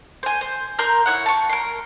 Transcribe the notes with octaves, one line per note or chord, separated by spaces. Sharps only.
C5 G#5
C5
A#4 A#5 C6 G6
E4 C#5 F#5
A5 C#6
A#4 C6